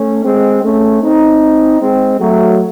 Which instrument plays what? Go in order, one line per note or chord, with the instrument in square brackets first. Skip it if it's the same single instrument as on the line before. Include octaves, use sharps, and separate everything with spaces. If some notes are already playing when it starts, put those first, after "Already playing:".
Already playing: [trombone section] A3 C#4
G#3 C4
A3 C#4
C4 D#4
G#3 C4
F#3 A3